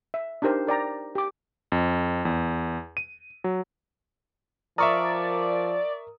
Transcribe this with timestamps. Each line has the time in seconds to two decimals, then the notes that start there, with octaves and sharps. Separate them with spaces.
0.14 E5
0.42 D4 D#4 G4 A#4 C5
0.67 A#4 D5 G5 A#5
1.15 G4 D6
1.72 F2
2.25 E2
2.97 D#7
3.44 F#3
4.78 F3 A#4 D5 E5 C#6 D#6